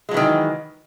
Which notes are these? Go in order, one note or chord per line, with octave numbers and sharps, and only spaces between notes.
D#3 E3 F#3 G#3